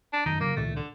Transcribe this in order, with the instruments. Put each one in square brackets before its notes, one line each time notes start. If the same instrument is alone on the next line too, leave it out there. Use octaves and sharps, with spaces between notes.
[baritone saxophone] D4
[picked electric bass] F#2 D#3 [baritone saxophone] D#4
[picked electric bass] G1 C#3 F#3 [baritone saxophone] A#3
[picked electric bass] C#2 A#2 D#3 [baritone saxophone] A3
[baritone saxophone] D3